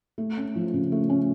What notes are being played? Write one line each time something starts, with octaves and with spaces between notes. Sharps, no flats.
A3
C#4
F3
C#3
A3
C#4